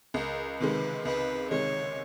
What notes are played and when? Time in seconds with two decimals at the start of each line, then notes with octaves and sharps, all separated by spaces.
0.14 C#2 A#4
0.59 C3 D#3 G#3 B4
1.05 C#2 B4
1.50 C3 D#3 G#3 C#5